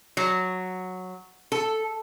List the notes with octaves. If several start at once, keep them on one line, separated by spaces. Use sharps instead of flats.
F#3
A4